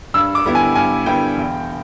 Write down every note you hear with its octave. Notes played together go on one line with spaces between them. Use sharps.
G2 E6
D6
D3 G3 B3 E4
G#5
G2 G#5
D3 G3 B3 E4 G5
E1